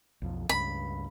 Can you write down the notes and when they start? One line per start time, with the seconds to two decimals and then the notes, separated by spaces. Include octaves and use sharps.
0.22 B1 F2
0.49 C#2 G2 B5